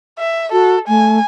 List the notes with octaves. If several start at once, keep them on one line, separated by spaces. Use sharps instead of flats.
E5
F#4 A4
A3 G#5